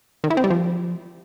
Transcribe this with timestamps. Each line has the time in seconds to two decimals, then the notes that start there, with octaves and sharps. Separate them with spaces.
0.24 D#3
0.30 E4
0.37 C4
0.44 G3
0.50 F3